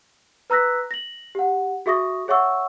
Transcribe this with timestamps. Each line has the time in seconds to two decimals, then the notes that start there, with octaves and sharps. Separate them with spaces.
0.50 B4 A#5 E6 F#6 A#6 B6
0.91 A#6 F#7
1.35 G4 F#5
1.86 F#4 G#4 E5 C#6 D#6 A#6
2.28 G#4 C#5 E5 F#5 C#6 E6